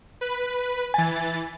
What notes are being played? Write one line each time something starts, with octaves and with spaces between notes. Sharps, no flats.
B4
E3 G#5 A6